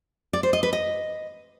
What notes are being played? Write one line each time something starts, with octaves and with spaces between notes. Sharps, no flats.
D5
C5
D#5
B4
D#5